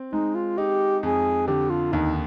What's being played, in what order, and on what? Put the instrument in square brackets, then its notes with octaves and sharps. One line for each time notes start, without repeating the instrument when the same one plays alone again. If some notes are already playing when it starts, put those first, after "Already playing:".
Already playing: [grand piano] C4
[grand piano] G#3 [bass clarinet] D#4
[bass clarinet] F4
[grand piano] D#4 [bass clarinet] G4
[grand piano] F2 [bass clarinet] G#4
[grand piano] D3 [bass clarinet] G4
[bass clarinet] F4
[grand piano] D#2 [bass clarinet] D#4